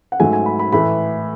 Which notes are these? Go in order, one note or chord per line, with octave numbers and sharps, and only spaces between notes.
F#5
G#2 F#3 A3 G#5
G#5
B5
B5
A2 E3 A3 B5